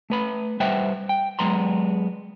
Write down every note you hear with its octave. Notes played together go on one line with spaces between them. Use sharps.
A3 B4 B5
G3 B4 C5 E5 F#5 G5
G5
F#3 G#3 B3 A#5 C6